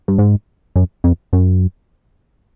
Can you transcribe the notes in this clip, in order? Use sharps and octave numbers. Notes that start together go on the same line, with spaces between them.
G2
G#2
F#2
F2
F#2